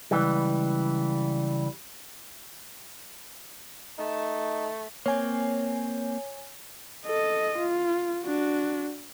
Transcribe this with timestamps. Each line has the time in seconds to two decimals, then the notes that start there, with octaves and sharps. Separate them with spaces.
0.11 C#2 F#2 E3 G3
3.98 A3 D#4
5.06 A#3 C4 C#5 G#5
7.06 A4 D#5
7.58 F4
8.24 D4 F#4